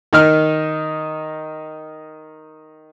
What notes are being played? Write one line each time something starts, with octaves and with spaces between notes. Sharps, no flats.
D#3 D#4 F6